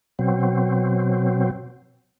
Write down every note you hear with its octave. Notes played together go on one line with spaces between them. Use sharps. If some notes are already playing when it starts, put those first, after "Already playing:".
B2 F#3 C4